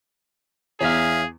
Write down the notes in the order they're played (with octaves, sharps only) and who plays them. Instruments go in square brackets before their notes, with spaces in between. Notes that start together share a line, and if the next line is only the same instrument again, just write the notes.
[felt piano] E2 [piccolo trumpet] G#4 [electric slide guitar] C#5 E5 F5